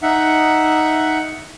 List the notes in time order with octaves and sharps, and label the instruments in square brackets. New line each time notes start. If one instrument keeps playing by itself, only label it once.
[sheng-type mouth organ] D#4 E5 F#5